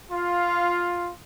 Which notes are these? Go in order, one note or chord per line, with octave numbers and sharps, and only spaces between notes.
F4